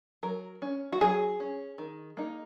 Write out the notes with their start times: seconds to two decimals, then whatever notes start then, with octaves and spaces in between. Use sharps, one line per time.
0.23 F#3 A#4
0.62 C#4
0.92 F#4
1.01 F#3 G#4
1.40 C#4
1.78 D#3
2.17 A#3 D#4